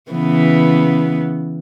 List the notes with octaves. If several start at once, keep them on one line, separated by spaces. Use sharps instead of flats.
C#3 E3 B3